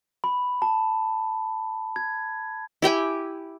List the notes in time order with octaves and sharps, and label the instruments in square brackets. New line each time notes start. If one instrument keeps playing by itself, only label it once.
[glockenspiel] B5
A5
G#6
[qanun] E4 G4 G5 G#5